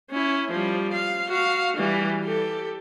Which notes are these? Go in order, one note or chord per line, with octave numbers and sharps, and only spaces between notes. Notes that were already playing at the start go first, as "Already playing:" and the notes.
C#4 E4
F3 G3
F5
F#4 F5
E3 G3
G4 A4